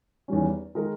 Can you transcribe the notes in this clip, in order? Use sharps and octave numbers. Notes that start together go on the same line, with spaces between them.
E2 D#3 G3 C#4
D#3 G#3 D#4 A#4